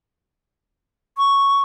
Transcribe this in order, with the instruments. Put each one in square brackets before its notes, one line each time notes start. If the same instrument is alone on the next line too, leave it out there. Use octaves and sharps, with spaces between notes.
[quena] C#6